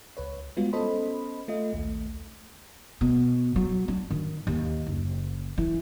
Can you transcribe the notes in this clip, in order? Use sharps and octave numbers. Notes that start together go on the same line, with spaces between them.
C#2 B4 C#5
G3 G#3 B3 F4 F#4
B3 C#4 A4 C5 D#5 B5
A3 F4 D#5
A#1 D#2 A3
B2
F#3
D4
D#3
D#2
F#1
E3